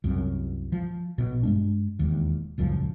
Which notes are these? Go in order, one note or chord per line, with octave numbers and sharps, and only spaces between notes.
C2 F#2
F3
A#1 B2
G2 G#3 D4
E1 D#2
D#1 C#2 F#2 F3